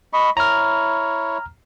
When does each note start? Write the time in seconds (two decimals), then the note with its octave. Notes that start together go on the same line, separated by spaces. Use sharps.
0.13 D#5 B5 C#6
0.37 E4 C#5 A#5 F6